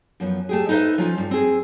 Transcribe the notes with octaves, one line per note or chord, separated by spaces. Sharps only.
F#2 F3 B3
A3 G4 G#4
D#4 A4 B4 C5 E5
F3 C#4 F4
G2
C4 G#4